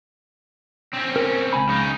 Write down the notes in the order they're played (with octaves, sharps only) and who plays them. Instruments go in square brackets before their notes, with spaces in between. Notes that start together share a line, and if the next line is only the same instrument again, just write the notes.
[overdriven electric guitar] C4 C#4
[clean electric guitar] A#4
C#2 G#5 B5
[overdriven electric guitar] C#3 D#4